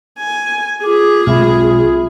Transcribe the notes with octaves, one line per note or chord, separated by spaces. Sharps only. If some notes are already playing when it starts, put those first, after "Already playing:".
G#5
F4 G#4 D6
B1 G#3 C4 F4 E5 B5